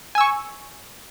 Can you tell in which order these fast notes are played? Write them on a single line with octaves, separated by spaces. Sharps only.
G#5 E6 C#6